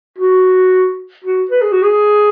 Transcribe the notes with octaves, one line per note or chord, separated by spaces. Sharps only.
F#4
F#4
B4
G#4
F#4
G#4